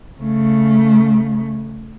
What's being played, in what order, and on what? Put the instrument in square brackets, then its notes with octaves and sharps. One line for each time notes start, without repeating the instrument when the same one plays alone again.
[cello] C#3 A3